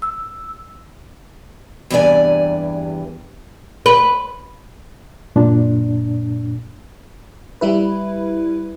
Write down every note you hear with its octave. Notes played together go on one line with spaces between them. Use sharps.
E6
E2 G2 C3 E3 D5 G#5
B4
F#2 A#2 D4
G3 E4 B4